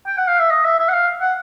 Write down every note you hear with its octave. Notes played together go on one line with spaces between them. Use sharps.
G5
F#5
F5
E5
D#5
E5
E5
F#5
F5
F#5